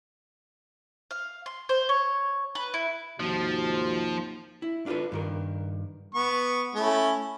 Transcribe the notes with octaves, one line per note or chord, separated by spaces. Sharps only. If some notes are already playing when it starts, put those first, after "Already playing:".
F5
C6
C5
C#5
B4
E4
D#2 G#2 C3 F3 F#4
E4
D4 F4 G#4 A4 B4
G2 D#3 A#4
B3 C#6
A3 C#4 E4